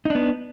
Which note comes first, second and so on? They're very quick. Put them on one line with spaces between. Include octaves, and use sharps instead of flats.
D#4 D4 B3